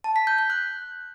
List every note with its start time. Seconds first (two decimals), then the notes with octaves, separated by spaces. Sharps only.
0.04 A5
0.16 B6
0.27 G6
0.38 G6
0.50 F#6